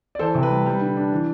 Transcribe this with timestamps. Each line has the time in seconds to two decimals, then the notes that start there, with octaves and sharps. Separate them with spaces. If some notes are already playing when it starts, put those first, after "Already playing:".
0.15 D5
0.19 E3 A4 C5
0.35 C3
0.43 B4
0.50 G3
0.66 G3
0.81 D3
0.97 D4
1.12 E3